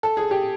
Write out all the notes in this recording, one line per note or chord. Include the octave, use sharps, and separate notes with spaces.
A4
G#4
G4